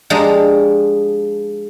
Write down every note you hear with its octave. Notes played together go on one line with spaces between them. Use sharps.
F3 G#3 D4 G4 A#5